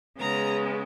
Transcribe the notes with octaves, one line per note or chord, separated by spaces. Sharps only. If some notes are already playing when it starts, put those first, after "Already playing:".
C#3 G#3 B3 A#5